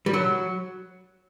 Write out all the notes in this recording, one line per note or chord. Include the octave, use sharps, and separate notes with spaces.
G3
F#3